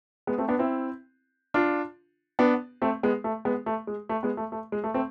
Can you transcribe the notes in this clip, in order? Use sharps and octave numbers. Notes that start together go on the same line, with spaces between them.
G#3 B3
A3 C4
B3 D4
C4 E4
D4 F4
B3 D4
A3 C4
G#3 B3
A3
G#3 B3
A3
G#3
A3
G#3 B3
A3
A3
G#3
A3
A3 C4